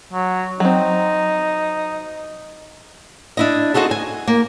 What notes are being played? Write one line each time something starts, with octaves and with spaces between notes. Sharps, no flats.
F#3
F#3 C4 D#4
D4 E4 D#5
C4 D#4 F#4 G#4 A4
G#5
A#3